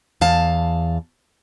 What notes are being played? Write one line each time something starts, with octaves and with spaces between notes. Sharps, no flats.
E2 F5 A5